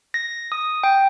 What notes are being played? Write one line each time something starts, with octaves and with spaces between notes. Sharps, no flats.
A#6
D#6
G5